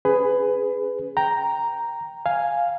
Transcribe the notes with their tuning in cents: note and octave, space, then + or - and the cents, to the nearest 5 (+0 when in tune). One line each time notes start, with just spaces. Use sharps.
C#4 +0 G#4 +0 B4 +20
G5 +0 A#5 +0
F5 +0 G#5 +0